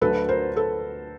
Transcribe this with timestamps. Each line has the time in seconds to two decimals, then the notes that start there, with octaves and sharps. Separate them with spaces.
0.01 D2 D3 F#3 A4 B4
0.29 A#4 C5
0.56 A4 B4